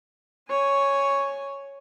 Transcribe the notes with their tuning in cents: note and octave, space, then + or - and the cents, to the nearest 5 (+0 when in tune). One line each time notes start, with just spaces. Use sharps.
C#5 +0 G#5 +0